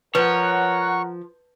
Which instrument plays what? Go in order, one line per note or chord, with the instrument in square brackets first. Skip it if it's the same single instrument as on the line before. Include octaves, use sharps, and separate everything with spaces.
[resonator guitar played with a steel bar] F3 [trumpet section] A#4 F#5 [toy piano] B4 [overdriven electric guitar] C#5